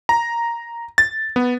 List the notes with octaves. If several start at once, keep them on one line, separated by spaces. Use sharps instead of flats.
A#5
A6
B3